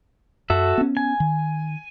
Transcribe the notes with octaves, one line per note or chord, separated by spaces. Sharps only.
F#2 F#4 A4 E5
B3 C#4
G#5
D#3